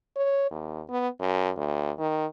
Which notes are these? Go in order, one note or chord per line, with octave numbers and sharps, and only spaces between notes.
C#5
D#2
B3
F#2
D2
D#3